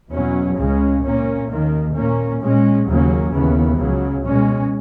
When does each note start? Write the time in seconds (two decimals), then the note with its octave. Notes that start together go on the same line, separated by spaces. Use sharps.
0.11 E2 B2 F#3 C#4
0.57 C#2 C#3 G#3 C#4
1.03 A#2 A#3 C#4
1.50 D#2 D#3 A#3
1.96 A#2 A#3 C#4
2.41 A#2 G#3 C#4
2.87 D#2 C#3 F#3 A#3 C#4
3.33 D#2 C#3 E3 B3
3.79 C#2 C#3 F#3
4.25 B2 G#3 C#4